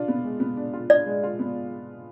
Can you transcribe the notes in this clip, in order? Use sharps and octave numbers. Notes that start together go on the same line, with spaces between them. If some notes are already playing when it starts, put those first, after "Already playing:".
Already playing: D4 F4
B3
G#3
B3
D4
F4
D4 D5
G#3
F4
B3